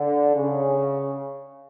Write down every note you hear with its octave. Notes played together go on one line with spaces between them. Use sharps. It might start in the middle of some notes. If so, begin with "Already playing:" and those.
Already playing: D3
C#3